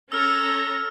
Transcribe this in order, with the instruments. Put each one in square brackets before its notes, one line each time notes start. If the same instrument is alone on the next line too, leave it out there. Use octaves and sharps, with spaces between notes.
[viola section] C#4 A4 A#5 [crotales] E6 F6